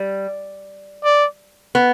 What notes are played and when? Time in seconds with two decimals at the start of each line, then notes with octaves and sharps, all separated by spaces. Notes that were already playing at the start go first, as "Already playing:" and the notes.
Already playing: G3
1.04 D5
1.75 B3